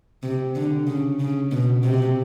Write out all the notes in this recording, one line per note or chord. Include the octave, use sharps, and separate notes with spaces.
C3
D3
C#3
C#3
B2
C3